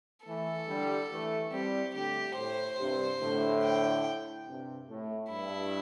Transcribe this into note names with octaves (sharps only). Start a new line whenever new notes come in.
E3 A3 A4
D3 G3
E3 A3
G3 C4 G4
A2 D3 G4
A2 C5
G2 C3
A2 D3
G5
G2 C3
A2
G2 E4